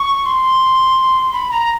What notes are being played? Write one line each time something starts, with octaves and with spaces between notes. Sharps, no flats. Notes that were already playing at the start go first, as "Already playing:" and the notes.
Already playing: C#6
C6
B5
A#5